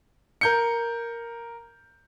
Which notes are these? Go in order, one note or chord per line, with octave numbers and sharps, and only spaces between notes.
A#4 G6 C#7